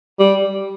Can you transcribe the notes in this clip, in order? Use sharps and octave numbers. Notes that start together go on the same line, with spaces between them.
G3